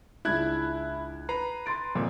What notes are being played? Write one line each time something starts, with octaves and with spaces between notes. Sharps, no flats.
C#2 D4 E4 F#6 G#6
B4 A#5 C7
C6 A6 D7
F2 A#2